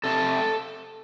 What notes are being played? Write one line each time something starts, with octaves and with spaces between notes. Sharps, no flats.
C3 A4